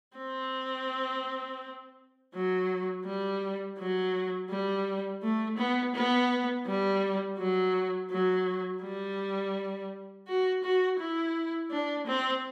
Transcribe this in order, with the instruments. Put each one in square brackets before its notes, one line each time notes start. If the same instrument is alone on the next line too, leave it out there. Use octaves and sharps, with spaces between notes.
[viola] C4
F#3
G3
F#3
G3
A3
B3
B3
G3
F#3
F#3
G3
F#4
F#4
E4
D4
C4